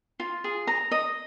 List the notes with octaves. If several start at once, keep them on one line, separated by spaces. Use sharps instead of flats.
F4
G#4
A#5
D#5